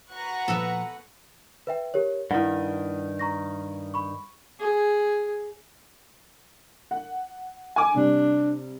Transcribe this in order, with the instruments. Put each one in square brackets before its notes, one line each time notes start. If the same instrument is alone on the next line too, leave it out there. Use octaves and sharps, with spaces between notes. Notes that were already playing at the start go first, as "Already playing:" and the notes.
[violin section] F#4 B4 F#5 [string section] A#5 C#6 F#6
[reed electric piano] A#2 F3 [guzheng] B3 A4
[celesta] B4 E5 G5
G4 A#4 C#5
[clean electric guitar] G2 D#3 [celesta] E4 F#5
[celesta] A#5 C#6 A#6
B5 C#6
[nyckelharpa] G#4
[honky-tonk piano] F#5
G#5 D6
[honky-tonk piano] C3 G3 [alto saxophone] D4